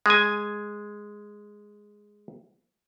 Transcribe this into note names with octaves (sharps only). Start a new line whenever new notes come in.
G#3 G#5